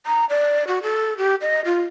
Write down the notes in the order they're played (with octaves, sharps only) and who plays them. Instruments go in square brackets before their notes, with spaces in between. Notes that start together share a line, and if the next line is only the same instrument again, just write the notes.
[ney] A#5
D5
F#4
A4
G4
D#5
F4